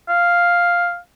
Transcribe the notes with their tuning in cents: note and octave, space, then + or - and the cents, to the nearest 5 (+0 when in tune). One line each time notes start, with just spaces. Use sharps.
F5 +0